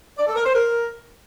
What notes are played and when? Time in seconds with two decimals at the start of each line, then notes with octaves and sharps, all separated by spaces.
0.18 D5
0.27 A4
0.36 A#4
0.45 C5
0.54 A#4